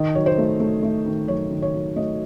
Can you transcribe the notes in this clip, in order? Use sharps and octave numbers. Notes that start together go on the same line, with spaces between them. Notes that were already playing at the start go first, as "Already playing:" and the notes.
Already playing: D#3 D#5
F#3 C#5
C5
A3
A3
A3
D#3
F#2 C#5
D#3
C#5
F#3
A3 D#5